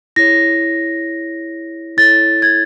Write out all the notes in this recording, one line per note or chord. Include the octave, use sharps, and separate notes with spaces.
E4 G#4 C#5 A#6
E4 A4 C#5 A6
G#6